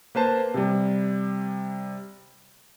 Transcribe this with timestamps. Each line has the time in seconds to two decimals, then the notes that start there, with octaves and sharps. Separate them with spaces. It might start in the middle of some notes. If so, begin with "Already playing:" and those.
0.15 A#3 B4 C5 A5
0.54 C3 G3